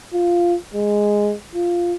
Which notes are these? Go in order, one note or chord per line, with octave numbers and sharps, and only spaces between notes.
F4
G#3
F4